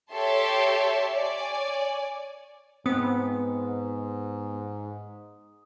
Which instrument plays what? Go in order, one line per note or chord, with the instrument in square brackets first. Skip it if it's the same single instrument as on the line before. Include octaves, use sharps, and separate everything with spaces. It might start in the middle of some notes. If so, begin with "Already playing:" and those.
[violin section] G4 A4 C#5 E5 A5 C6
C#5 D5 G#5
[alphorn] G#2 [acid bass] B3 [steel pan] C4 [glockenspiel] D#6